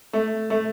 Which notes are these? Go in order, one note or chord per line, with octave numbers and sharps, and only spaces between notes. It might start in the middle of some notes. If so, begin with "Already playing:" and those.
A3
A3